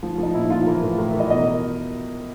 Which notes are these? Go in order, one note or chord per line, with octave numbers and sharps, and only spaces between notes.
F3
F3 D#4
A#2 E4
F3 F4
E3 A#4
A2
A2 A#4
E5
E3
D#5
B2 D#5
A#4